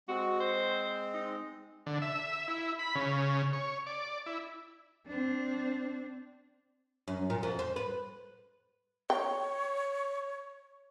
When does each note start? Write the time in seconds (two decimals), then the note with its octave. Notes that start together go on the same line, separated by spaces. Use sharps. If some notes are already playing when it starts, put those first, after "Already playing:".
0.09 G#3 C4 F#4
0.40 C5
1.14 D#4
1.86 D3
2.02 E5
2.48 E4
2.79 B5
2.95 C#3
3.53 C#5
3.86 D5
4.26 E4
5.06 C4 D4
7.08 F#2
7.30 A#2
7.43 F2
7.59 C5
7.76 B4
9.10 C#5 G5